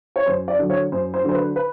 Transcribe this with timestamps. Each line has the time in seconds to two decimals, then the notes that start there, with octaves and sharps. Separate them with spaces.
0.16 C#5
0.26 F#2 C5
0.48 D5
0.59 D3 F#3
0.70 C#5
0.92 F#2 C5
1.14 C5
1.24 D3 F#3 C5
1.35 B4
1.56 B4